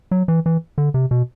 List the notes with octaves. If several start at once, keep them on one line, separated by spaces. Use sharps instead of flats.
F#3
E3
E3
D3
C3
B2